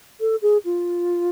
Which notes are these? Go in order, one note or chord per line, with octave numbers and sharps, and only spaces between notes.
A4
G#4
F4